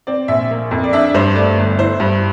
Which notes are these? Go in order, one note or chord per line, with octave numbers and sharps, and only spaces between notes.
C4 D5
A#1 E5
A#3
F2
D5
D4 E5
G2 C5
A3 D5
G1
E4 C5
G2